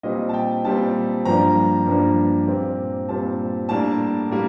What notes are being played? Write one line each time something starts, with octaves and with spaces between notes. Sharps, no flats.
A#2 G3 C4 D#5
A5
G5
A#2 G3 C4 A5
G2 F3 A#3 D4 A#5
G2 F3 A#3 D4
A#2 G3 C4
A#2 G3 C4 A5
A2 G3 A#3 D4 A5
A2 G3 A#3